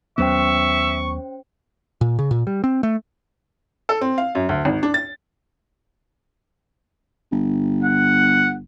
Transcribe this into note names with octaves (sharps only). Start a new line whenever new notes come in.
D#2 F#3 B3 C#4 C5 E5 G5 C#6
A#2
C#3
A#2
G3
C4
A3
A4
C4
F5
F#2
D2
G#1
D4
A6
G1
F#5